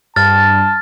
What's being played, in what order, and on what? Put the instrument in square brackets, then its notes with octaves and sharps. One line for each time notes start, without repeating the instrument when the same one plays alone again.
[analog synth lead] G2 [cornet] A5 [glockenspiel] F6 A6